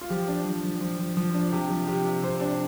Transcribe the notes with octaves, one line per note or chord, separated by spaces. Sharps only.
F4
F3 G4
D4
F3
F3
F3
F3
F3
D4
C3 G4
F3
C3 G4
C3
C3 C5
D4